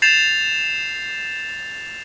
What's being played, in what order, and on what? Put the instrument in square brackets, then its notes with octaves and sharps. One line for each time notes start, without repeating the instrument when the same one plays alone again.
[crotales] G6 A6 C7 E7 F7